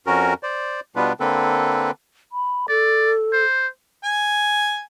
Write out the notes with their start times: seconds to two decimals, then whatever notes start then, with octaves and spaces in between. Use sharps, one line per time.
0.07 F2 C#4 F#4 A#4
0.43 C5 D5
0.96 B2 G3 B3 D4 F4 B4
1.20 D3 A#3 C4 A4 B4
2.32 B5
2.69 A4 D5
3.33 C5
4.04 G#5